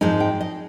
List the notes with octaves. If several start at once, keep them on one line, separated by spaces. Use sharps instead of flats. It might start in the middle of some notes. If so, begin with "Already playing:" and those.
G#2 F3 G#3 C4 D#4 G#5
G5
D#5